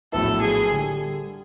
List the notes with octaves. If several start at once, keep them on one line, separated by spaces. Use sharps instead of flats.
A#1 A2 F#3 B3 E4 A4
G#4
D3 G3